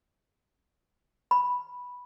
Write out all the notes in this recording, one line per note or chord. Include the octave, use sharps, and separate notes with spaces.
B5